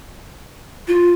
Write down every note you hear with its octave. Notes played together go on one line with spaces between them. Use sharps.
F4